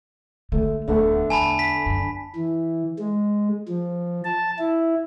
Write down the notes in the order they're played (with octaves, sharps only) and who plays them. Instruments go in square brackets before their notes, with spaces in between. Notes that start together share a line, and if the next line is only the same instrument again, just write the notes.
[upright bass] D3 [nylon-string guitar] A3
[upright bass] D1 D2 [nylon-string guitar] D3 A3 B3
[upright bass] E2 [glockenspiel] G#5 A5 B5
[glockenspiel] B6
[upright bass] F#2
[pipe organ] E3
G#3
F3
A5
E4